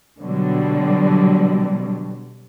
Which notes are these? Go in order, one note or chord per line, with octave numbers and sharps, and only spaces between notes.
B2 D3 F#3 G3